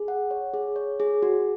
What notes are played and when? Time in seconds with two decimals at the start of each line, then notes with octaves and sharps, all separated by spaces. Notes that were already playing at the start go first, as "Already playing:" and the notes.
Already playing: G#4
0.08 F#5
0.31 C#5
0.54 G#4
0.76 C#5
1.00 G#4
1.22 F#4